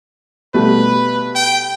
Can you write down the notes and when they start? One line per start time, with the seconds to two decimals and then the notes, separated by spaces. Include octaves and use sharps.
0.54 B2 G3 A3 B4
1.35 G5